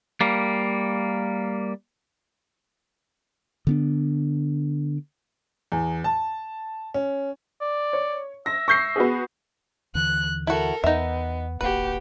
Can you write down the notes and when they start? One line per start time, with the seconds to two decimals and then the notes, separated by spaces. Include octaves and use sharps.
0.21 G3 A#3
3.67 D3 B3 D4
5.72 E2
6.04 A5
6.94 C#4
7.61 D5
7.93 C#5
8.46 E5 A#6
8.68 C#6 G6 A#6 C7
8.96 B3 F#4 G#4
9.95 D#2 D3 E3 F#6
10.47 E4 F#4 A4 A#4
10.84 E2 B3 D#4 E5
11.61 D1 G1 A#3 F#4 G4 B4